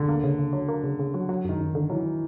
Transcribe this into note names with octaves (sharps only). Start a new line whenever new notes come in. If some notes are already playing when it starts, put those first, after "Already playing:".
Already playing: D3
A#3
C#3
C#3
F#3
A#3
C#3
C#3
F#3
F#3
F#2 D#3
F#2
D3
E3 F#3